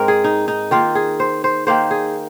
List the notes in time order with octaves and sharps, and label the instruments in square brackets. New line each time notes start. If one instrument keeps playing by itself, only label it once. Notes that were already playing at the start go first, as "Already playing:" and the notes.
Already playing: [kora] G#2 G#3 C4 A#4
G#4
D#4
D#4
D#3 A#3 F4
G#4
C5
C5
D#3 A#3 C5
G#4